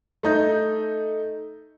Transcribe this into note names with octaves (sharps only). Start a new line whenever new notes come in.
A3 D#4 G6